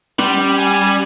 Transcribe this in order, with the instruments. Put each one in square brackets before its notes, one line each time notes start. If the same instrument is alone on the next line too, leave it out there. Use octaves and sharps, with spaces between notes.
[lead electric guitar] G3 [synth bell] C#4
[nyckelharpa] G#5